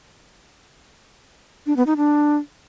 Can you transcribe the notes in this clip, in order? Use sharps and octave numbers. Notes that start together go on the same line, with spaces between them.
D4
B3
D#4
D4